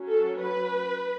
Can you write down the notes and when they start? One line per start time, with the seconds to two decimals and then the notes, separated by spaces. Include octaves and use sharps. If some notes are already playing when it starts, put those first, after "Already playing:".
Already playing: F#3 C#4
0.09 A4
0.40 B4